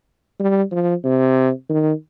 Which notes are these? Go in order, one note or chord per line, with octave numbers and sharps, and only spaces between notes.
G3
F3
C3
D#3